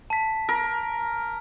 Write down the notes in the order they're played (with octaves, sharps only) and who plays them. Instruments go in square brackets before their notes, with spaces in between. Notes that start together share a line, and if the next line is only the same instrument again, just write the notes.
[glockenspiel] A5 B6
[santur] A#4